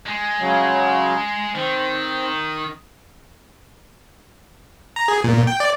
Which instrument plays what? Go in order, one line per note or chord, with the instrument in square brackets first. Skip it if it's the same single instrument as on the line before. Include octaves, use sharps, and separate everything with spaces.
[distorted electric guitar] G#3
[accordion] C#3 F#3
[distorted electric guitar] D#3 [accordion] C4
[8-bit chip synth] A#5
G#4
A#2
G5
D5